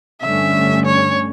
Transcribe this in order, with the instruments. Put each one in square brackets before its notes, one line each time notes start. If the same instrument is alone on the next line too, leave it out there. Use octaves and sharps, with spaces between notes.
[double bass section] G2 D3 A3 C#4 [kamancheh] E5
[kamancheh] C#5